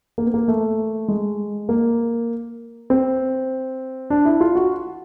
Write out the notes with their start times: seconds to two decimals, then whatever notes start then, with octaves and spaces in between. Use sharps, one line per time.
0.18 A#3
0.26 B3
0.34 A#3
0.48 A3
1.08 G#3
1.69 A#3
2.90 C4
4.10 D4
4.25 E4
4.41 F4
4.55 F#4